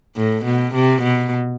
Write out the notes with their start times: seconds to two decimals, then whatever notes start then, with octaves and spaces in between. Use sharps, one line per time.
0.16 A2
0.45 B2
0.74 C3
1.03 B2